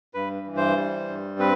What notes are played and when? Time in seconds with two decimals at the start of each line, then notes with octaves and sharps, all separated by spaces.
0.14 G2 B4
0.47 E3
0.56 C5
0.77 G3
1.08 G2
1.39 C4 B4